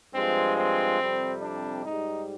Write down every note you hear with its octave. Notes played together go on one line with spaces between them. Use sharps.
G2 F3 G#3 C4
C4
F2 C3 G3
D4
G#2 G3 D#4